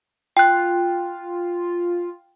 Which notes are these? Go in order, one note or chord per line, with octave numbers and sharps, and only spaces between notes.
F4 G5 F#6